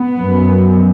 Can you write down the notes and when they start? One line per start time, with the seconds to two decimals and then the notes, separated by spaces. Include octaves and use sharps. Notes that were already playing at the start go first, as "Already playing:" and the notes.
Already playing: B3
0.21 F#2